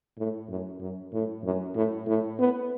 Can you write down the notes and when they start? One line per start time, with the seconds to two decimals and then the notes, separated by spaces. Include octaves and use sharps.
0.18 A2
0.49 F#2
0.80 F#2
1.13 A2
1.44 F#2
1.75 A2
2.07 A2
2.39 B3